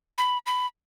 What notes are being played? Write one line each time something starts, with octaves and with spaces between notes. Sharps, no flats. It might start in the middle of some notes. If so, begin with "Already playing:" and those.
B5
B5